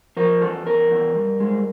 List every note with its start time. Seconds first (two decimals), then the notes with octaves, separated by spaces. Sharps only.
0.17 F3 A#4
0.41 E2 A4
0.66 E2 A#4
0.91 E2
1.16 G2
1.40 G#3